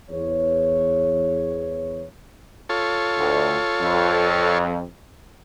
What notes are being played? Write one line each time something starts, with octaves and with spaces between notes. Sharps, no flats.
E2 C#5
F4 A4 C#5
D2
F2